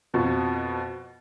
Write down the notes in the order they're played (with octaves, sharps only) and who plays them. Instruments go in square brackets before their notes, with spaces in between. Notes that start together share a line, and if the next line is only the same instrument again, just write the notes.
[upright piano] F2 B2 F3